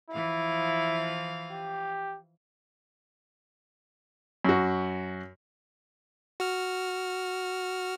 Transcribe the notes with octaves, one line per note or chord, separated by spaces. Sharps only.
E3 F3 E4 F5
G4
F#2 F#4
F#4 F6